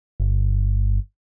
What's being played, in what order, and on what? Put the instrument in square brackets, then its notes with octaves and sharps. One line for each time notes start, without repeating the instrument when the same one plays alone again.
[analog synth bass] G1